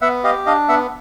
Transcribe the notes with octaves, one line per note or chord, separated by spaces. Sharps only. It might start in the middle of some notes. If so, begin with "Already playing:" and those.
B3 E5 F#5
G4 D#5 F5
D4 D#5 F5
B3 E5 F#5